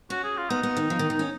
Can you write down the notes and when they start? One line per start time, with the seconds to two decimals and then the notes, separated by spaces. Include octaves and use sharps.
0.10 C#4 F#4
0.24 G#4
0.37 F4
0.50 B3 D#4
0.63 B3
0.77 D#3
0.90 F3
0.99 D#3
1.10 D#3
1.19 C#4